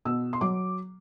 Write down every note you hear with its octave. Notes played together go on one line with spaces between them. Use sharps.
B2 E6
C6
F#3 D6